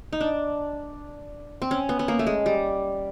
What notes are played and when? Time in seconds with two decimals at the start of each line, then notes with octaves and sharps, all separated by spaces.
0.13 D#4
0.21 D4
1.62 C4
1.71 C#4
1.89 B3
1.99 B3
2.08 A#3
2.19 A3
2.27 G#3
2.46 G3